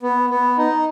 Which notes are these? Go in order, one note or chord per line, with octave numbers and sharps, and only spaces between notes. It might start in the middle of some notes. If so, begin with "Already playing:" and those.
B3
B3
D#4